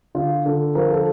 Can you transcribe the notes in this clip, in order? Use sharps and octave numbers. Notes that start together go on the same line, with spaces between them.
D3 F4
D3 A4
F3 A#4
A4